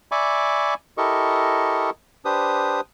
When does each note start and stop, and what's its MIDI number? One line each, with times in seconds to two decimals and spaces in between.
0.12 0.74 74
0.12 0.74 76
0.12 0.74 80
0.12 0.74 83
0.12 0.74 85
0.12 0.74 86
0.98 1.90 64
0.98 1.90 67
0.98 1.90 69
0.98 1.90 70
0.98 1.90 75
0.98 1.90 85
2.25 2.80 62
2.25 2.80 67
2.25 2.80 71
2.25 2.80 72
2.25 2.80 87